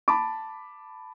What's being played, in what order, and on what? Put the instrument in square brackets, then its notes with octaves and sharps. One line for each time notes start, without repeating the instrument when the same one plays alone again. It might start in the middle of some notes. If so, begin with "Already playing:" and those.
[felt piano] A5 B5 D6